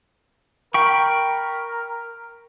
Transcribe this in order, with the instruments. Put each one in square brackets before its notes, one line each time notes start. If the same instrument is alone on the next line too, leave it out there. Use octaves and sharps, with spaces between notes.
[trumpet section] A#4 [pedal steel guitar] G5 B5 C#6